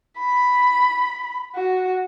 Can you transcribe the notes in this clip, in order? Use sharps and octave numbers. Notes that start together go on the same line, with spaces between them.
B5
F#4